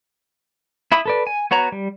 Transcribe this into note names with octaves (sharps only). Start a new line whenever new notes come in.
E4 E5 B5 D#6
A4 B4 D5
G#5
B3 F#4 C#5 A#5
G3